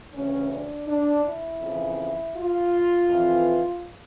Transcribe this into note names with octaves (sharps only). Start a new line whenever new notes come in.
D2 C#3 E3 C#4
D4
D4
E4
F2 C#3 E3
F4
F2 E3